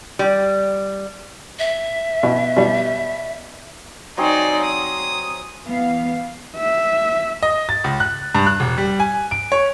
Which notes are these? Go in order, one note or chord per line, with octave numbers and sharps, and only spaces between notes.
G3
E5
B2
B2 G3
F#3 C4 D#4 G#4 D5
D#6
E3 B3 F5
E5
D#5
A6
C#2
F#6
G2
F#6
E1
G3
G#5
D7
C#5